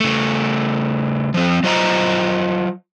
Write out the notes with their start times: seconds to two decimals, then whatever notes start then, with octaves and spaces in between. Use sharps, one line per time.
0.01 C#3 A3
1.34 F3 C4
1.63 F#3 F4 C5 D#5 F5 A#5